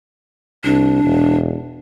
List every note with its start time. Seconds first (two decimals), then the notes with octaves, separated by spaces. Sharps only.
0.64 C2 D4
1.04 E1